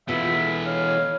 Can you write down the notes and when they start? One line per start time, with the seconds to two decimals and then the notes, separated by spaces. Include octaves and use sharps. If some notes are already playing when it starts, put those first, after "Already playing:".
0.08 B2 E3 B3 F4 A4 E5
0.66 C#5 F5